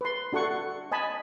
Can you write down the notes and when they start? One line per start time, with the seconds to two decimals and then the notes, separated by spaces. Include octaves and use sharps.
0.01 B4 C6
0.32 D4 F#4 A4 F#5 C#6
0.92 D#5 G#5 A5 B5